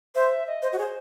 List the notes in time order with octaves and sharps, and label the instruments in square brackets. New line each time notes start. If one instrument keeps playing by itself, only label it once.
[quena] C5 [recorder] E5
[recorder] D#5
[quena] C5
F#4
[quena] G#4 [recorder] C#5
[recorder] C5